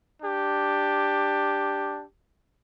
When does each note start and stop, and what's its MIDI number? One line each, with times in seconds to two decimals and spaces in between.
0.21 2.04 62
0.21 2.04 67